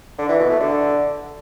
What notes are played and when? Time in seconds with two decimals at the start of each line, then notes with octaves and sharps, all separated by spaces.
0.19 D3
0.29 E3
0.39 B2
0.50 A3
0.60 D3